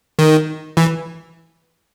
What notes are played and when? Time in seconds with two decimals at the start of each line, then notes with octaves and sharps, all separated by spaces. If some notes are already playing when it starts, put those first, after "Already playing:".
0.19 D#3
0.77 E3